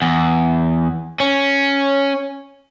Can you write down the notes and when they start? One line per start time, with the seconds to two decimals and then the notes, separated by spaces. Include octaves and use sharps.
0.02 E2
1.20 C#4